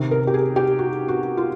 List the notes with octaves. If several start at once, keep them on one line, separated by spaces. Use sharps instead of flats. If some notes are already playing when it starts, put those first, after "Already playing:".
Already playing: C3 D#3
A#4
G4
G#4
G4
F#4
F#4
F4